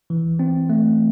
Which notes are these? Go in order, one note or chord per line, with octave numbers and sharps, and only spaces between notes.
E3
C4
A3